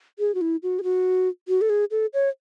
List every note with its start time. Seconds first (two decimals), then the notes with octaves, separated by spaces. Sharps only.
0.19 G#4
0.35 F#4
0.41 E4
0.63 F#4
0.79 G#4
0.83 F#4
1.48 F#4
1.61 A4
1.70 G#4
1.91 A4
2.14 C#5